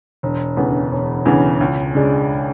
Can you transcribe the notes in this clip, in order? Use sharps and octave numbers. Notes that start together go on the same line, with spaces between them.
E1
D2 C#3 E3 B3
E1
D2 C#3 E3 B3
C#2
C#3 G#3 D4